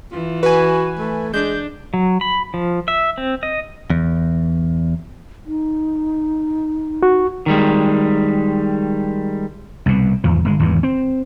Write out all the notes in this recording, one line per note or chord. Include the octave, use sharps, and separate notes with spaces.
E3 F4
F#4 B4 G#5
A3
G#3 D4 G6
F#3
B5
F3
E5
C4
D#5
E2
D#4
F#4 C#6
D#3 G3 G#3
C2 B2
G#1 E2 F3
G1 G#3
G#1 E2 G2
C4